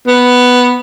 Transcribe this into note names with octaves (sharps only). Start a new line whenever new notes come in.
B3